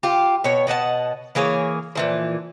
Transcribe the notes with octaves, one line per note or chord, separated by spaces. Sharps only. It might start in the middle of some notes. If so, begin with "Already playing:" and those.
F4 G4
B2 C#5
B2 D#5 F#5 A5
E3 A#3 G#4 C#5
A#2 E3 F3